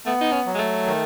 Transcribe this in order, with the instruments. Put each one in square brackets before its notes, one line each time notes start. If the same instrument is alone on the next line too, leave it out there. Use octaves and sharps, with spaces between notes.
[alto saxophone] A3 [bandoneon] B3
[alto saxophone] D#4
C#4
[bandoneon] F#3
[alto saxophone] G#3
A3
[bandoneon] D#3